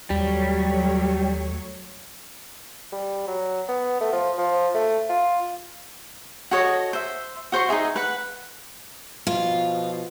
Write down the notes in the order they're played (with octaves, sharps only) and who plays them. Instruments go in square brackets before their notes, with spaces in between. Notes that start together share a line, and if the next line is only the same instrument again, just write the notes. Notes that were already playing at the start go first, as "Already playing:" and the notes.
[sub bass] D#2 [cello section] F#3 A3 C#5 [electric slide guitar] G3
[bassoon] G3
F#3
B3
A3
F3
F3
A3
F4
[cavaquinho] F#4 A4 C#5 D#5
C5 E5
F#4 C5 C6 C#6
D#4 F#4 G#4 E5
B4 F#5
[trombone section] B2 F3 [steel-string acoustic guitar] F4